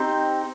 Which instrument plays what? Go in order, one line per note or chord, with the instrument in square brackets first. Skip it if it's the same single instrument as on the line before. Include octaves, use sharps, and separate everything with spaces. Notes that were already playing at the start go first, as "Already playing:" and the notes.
Already playing: [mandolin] C4 D#4 G4